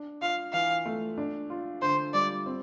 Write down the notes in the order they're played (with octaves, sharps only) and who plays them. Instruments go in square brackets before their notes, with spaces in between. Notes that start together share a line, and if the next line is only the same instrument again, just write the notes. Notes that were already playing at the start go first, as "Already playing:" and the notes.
Already playing: [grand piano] D4
[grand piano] F4 [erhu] F5
[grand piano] E3 [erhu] F5
[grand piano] A3
D4
F4
[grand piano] D3 [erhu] C5
[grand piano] G3 [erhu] D5
[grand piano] C4